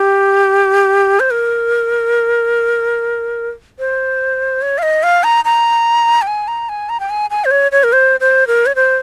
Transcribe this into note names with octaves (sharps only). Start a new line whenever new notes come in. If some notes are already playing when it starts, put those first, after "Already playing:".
Already playing: G4
C5
A#4
C5
C#5
F5
D#5
F5
A#5
A#5
G5
G#5
A#5
G#5
A#5
G5
G#5
G#5
C5
C#5
C#5
A#4
C5
C5
A#4
C#5
C5